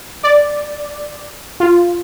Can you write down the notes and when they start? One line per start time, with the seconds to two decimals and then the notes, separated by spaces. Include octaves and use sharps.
0.23 D5
1.60 F4